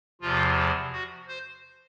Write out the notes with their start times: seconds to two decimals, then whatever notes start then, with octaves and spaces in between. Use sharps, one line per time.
0.22 E2 C3 F3 F4
0.93 F#4
1.28 C5